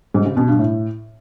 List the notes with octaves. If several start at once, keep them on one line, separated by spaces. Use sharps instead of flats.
G#2
C#3
B2
G2
A2